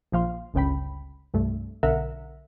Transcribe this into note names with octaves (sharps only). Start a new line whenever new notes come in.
A#1 F3 F5 C6
G1 C#2 C#3 G5 B5
C2 G2 A3
B1 D3 A#4 E5 F#5